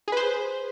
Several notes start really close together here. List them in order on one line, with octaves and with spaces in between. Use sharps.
G#4 B4 C5